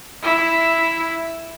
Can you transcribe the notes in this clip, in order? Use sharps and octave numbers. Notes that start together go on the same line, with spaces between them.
E4 E5